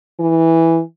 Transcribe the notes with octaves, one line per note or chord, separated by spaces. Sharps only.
E3